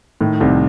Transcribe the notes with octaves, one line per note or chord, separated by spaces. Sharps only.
A2 D#3
C2 C3 D#3